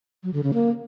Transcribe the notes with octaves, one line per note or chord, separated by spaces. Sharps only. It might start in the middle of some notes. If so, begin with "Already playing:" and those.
F#3
D3
C#3
A#3